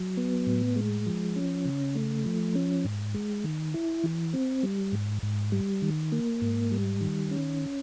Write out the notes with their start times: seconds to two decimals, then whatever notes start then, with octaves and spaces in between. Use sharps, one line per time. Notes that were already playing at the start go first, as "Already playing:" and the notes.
Already playing: F#3
0.17 B3
0.47 A2
0.76 G#3
1.06 F3
1.36 C#4
1.66 C#3
1.95 A3
2.25 F3
2.55 C#4
2.85 G#2
3.14 G#3
3.44 D#3
3.74 E4
4.04 E3
4.34 C4
4.63 G3
4.92 G#2
5.23 G#2
5.52 G3
5.82 D#3
6.12 A#3
6.42 G#2
6.72 G3
7.01 D#3
7.31 C#4